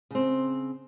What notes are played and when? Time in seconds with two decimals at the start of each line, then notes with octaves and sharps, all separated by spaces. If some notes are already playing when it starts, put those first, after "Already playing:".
0.11 C#3 C4